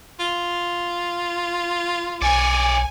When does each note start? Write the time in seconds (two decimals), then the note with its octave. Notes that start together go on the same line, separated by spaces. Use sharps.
0.19 F4
2.22 B1 C#5 D5 G#5